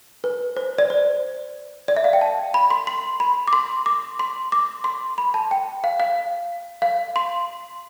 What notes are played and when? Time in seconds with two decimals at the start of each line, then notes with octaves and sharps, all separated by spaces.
0.24 B4
0.57 C5
0.78 D5
0.90 C5
1.88 D5
1.97 E5
2.04 F5
2.13 G5
2.21 A5
2.54 B5
2.70 C6
2.87 C6
3.20 B5
3.47 D6
3.53 C6
3.86 D6
4.19 C6
4.52 D6
4.84 C6
5.18 B5
5.34 A5
5.51 G5
5.84 F5
6.00 F5
6.82 F5
7.16 C6